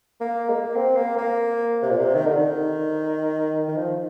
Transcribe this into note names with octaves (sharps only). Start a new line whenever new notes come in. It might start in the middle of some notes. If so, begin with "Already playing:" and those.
A#3
G#3
A#3
C4
A#3
A#3
C3
A#2
C3
D#3
D3
D#3
D#3
F3